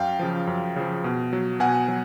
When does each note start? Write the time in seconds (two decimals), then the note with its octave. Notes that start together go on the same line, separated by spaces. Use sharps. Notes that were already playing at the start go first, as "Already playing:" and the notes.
Already playing: F#2 F5 G5
0.19 C#3 F3
0.47 F#2
0.76 C#3 F3
1.04 B2
1.33 F#3
1.60 B2 F#5 G#5
1.88 F#3